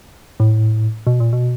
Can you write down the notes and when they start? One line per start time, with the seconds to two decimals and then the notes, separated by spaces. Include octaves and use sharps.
0.40 A2
1.07 B2
1.20 A#2
1.33 B2